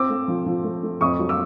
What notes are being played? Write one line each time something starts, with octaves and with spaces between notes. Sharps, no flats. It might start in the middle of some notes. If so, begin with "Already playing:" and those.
Already playing: C4 D6 E6
A3
F3
F3
A3
A3
F2 C#6 D#6
F#3
D6 E6